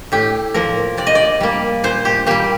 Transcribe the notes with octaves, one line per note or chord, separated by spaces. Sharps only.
A2 G4
F3 A#3 A#4
C3 D5
D#5
D5
G3 A#3
A#2 C5
G4
G3 A#3 G4